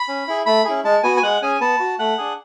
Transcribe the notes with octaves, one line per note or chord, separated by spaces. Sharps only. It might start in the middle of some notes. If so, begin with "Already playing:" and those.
Already playing: B5
C#4
E4 G#4
A3 B5
C#4 E4 G#4
G#3 A5
B3 F#4 G#5
G#5
G#3 F#5
C#4 G#4 G#5
B3 A5
F#4
A3 F#5
D4 G#4